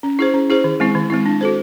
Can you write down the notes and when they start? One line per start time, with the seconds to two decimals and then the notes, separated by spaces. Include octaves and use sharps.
0.03 C#4
0.19 E4 G#4 C5
0.34 C#4
0.50 E4 G#4 C5
0.64 D#3
0.80 G#3 C4 E4
0.95 D#3
1.10 G#3 C4 E4
1.26 D4
1.41 F#4 A4 C5